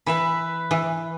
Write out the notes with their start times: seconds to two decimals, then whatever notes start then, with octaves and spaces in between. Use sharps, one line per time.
0.06 E3 B4 E5 B5
0.71 E3